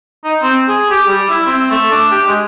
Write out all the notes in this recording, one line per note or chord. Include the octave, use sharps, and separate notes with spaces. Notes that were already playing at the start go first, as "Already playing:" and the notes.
D#4
C4
G#4
G4
G3
E4
C4
A3
D4
G4
G#3